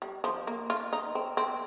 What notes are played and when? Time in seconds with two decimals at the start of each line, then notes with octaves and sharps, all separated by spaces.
0.02 G3
0.24 F3
0.47 A#3
0.70 F4
0.93 D#4
1.15 C4
1.37 C4